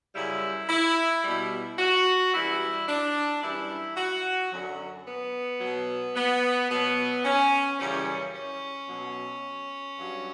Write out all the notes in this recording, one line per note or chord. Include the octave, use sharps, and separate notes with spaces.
F#2 C#3 G3 E4
E4
B2 G3
F#4
F#2 E3 G3 E4
D4
F#2 E3 G3 E4
F#4
F#2 D3 F#3
B3
B2 F#3
B3
B2 F#3 B3
C#4
F#2 C#3 E3 G3 C#4
C#4
B2 F#3
G2 F#3